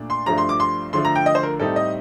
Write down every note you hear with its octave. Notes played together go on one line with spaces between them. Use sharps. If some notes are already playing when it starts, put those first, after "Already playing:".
Already playing: A#2 A3 D4
C6
G2 F3 A3 D4 A#5
C6
D6
C6
D3 F3 A3 C6
A#5
G5
D#5
C5
A#4
A2 G3 C4 D#4 A4
D#5